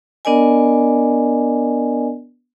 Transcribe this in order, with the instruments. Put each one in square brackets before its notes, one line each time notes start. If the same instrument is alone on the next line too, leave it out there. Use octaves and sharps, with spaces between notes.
[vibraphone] B3 D4 A#4 D5 D#5 G#5